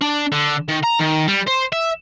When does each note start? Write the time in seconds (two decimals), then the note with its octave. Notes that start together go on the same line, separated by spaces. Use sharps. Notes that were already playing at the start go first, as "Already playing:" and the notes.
0.02 D4
0.32 D3
0.68 D#3
0.84 A#5
0.99 D#3
1.28 G3
1.47 C5
1.72 E5